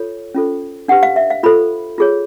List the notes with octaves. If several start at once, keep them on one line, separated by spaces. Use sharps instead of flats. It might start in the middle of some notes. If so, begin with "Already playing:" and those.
Already playing: F4 A4 C#5
C#4 F4 A4 C5
D4 G4 B4 F#5
F5
E5
F5
F4 A4 C5 B5
F4 G#4 C#5